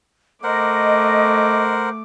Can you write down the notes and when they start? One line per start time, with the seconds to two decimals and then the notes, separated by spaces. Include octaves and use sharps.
0.44 A3 A#4 C5 D#5 F#5 D6